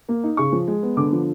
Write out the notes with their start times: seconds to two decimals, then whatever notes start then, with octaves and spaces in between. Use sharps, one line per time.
0.09 A#3
0.23 D#4
0.37 C#3 C#6
0.52 F3
0.67 G#3
0.83 B3
0.97 D3 D6
1.12 F3